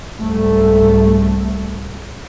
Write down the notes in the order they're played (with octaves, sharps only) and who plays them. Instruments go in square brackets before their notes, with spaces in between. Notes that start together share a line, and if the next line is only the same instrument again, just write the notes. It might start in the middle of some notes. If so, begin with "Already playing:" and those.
[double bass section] C2 G#2 A3